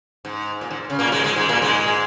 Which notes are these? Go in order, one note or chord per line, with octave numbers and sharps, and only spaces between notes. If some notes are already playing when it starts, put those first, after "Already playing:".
G#2
A#2
G#2
C#3
A#2 A#3
G#2 G#3
G#2 G#3
G#2 G#3
A#2 A#3
G#2 G#3